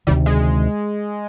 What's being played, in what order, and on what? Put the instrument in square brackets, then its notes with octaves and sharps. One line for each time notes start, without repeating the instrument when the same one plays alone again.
[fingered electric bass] D2 C3 D#3 [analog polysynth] G3
[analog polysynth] G#3